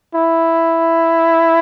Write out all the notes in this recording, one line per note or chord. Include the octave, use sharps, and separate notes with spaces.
E4